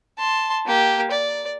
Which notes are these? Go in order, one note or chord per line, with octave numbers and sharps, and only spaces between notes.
A5 C6
A#3 G4
D5